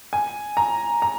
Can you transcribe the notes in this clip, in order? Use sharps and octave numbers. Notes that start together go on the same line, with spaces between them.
G#5
A#5
A#5